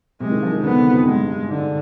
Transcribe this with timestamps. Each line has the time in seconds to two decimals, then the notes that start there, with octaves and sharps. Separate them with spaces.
0.20 C3 G#3
0.31 D#3
0.43 F3
0.53 D#3
0.63 D3 B3
0.78 C3
0.92 F2
1.05 G2 G#3
1.27 G2
1.48 G#2 D3